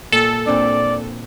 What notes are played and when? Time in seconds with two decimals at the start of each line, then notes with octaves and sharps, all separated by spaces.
0.12 A#2 A4
0.47 A#2 C4 D4 D5